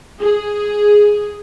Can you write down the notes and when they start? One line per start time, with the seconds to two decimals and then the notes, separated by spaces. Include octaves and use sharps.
0.20 G#4